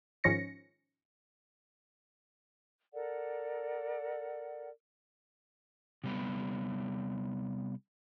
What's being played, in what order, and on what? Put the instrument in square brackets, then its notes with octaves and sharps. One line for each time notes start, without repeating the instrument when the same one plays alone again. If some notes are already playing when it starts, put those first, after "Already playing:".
[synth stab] G#2 D#3 F3 C#4 A#6 C#7
[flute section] A4 A#4 D5 F#5
[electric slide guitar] C3 G3 B3